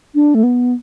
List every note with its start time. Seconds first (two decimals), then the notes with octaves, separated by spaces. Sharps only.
0.15 D4
0.35 A3
0.43 B3